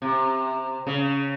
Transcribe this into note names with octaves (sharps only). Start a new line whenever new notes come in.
C3
C#3